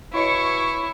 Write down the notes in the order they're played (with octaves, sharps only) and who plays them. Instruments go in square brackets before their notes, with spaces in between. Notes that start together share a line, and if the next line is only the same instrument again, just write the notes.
[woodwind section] B2 C#5 C#6 [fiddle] E4